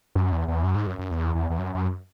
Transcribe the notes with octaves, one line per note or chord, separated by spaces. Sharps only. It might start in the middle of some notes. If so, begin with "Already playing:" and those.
F#2
E2
E2
F#2
G#2
F#2
F#2
E2
E2
E2
F#2
F#2